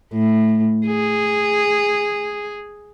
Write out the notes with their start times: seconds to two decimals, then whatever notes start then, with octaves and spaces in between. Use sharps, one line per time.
0.12 A2
0.87 G#4